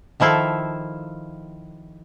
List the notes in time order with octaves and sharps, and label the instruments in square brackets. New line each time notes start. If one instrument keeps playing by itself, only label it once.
[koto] D#3 F3 E4 F4 A4